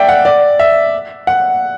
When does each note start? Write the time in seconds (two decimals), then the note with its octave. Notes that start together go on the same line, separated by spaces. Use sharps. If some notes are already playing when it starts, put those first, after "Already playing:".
Already playing: D5 E5 G5
0.09 F#5
0.25 D5
0.59 E5
1.27 F#5